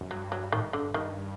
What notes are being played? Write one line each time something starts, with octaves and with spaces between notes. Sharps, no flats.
F#2
G2 F#3
F#3
A2 D#3
G2
F#2 D3
G2
G2 D#3